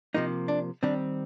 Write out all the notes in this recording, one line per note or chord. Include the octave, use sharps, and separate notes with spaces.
C3 F3 A#3 D#4
D4
D#3 G3 C4 D4